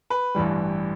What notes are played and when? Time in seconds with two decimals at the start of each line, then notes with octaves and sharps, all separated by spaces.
0.10 B4
0.35 A1 G2 E3 G3